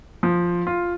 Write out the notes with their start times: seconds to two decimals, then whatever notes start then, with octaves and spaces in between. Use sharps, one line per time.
0.23 F3
0.67 F4